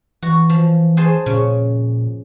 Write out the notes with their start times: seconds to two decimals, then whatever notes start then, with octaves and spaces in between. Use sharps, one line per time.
0.22 E3 F#4
0.50 F3
0.97 G#4 C5 A5
1.26 A#2 C#3